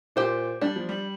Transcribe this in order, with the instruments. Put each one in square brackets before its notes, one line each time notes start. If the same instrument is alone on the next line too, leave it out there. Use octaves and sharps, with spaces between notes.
[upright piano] A#2 [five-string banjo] G4 C5
[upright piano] G3 [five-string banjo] D4
[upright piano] F3
G3